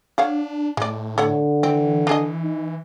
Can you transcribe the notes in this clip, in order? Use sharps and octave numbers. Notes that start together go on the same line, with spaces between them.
D4 C#5 F5 F#5
A2 G#3 D5
D3 A4 C#5 F#5
E3 C4
D4 G#4 D#5
D#4